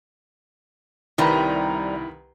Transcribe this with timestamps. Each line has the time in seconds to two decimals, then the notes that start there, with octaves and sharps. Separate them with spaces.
1.18 C2 C3 D#3 G3 E4 B4 A#5 B5